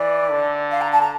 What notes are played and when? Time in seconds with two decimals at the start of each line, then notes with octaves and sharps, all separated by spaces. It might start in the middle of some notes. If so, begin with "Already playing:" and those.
Already playing: E3 D5
0.30 D3
0.71 F5
0.81 A#5
0.92 A5
1.02 A#5